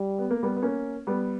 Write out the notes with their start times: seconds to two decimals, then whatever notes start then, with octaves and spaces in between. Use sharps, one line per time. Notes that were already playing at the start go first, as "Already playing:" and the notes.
Already playing: G3
0.19 B3
0.31 A#3
0.43 G3 B3
0.57 B3
0.62 A#3 C#4
1.07 G3 B3